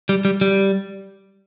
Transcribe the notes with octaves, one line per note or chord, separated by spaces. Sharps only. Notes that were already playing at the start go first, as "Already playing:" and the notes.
G3
G3
G3